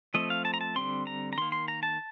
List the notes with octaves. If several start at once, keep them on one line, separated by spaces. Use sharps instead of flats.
F3 A3 C4 D#5
F5
A5
A#5
A5
D3 G3 C4 C6
A#5
A#5
D#3 A#3 C6
C6
A#5
A5